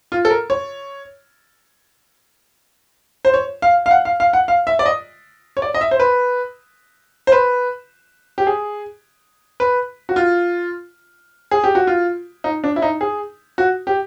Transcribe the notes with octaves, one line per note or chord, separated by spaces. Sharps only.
F4
A4
A#4
C#5
C5
C#5
F5
F5
F#5
F5
F5
F#5
F5
E5
D5
D#5
C#5
D5
D#5
E5
C5
B4
C5
B4
G4
G#4
B4
F#4
F4
G#4
G4
F#4
F4
D#4
D4
E4
D#4
G#4
F#4
G4